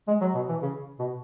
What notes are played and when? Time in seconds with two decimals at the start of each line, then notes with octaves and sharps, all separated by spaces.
0.08 G#3
0.21 F#3
0.34 B2
0.49 E3
0.62 C#3
0.99 B2